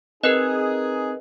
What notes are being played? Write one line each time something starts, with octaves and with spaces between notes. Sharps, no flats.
C4 D#4 G#4 A#4 B4 D#5 F#6